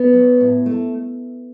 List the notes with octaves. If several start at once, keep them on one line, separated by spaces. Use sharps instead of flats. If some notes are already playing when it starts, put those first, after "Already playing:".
Already playing: B3
F#3
A2
A3